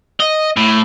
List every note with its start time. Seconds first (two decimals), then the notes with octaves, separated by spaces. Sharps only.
0.20 D#5
0.57 A2